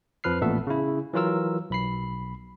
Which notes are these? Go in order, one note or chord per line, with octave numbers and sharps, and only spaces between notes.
F2 F3 B4 F6 C7
A1 A#2 A3 B3 A4 E5
C#3 E4
E3 F#3 F4 A#4 E6
B1 B5 C7